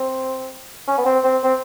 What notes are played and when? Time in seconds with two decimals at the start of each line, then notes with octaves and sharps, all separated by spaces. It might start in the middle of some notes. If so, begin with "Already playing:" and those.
Already playing: C4
0.87 C#4
0.98 B3
1.05 C4
1.24 C4
1.43 C4